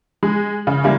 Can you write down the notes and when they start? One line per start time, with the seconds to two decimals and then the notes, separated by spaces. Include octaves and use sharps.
0.23 G#3
0.67 C#3
0.84 C#3 G3 G#3 A#3 E4